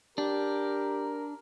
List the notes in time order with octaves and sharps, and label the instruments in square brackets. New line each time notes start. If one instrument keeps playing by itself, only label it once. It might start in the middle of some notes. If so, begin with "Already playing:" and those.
[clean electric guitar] D4 [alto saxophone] G4 [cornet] A#4